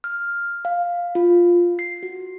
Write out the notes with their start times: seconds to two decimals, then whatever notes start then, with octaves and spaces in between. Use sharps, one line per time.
0.04 F6
0.65 F5
1.15 F4
1.79 C7
2.03 F#4